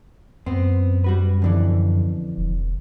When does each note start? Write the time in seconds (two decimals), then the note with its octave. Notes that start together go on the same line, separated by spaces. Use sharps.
0.46 F#2 B3 C4
1.04 G3 F#4 B4
1.42 F2 D3 E3
2.37 E1